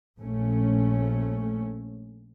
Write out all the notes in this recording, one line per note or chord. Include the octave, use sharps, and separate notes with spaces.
A#1 A3 C#4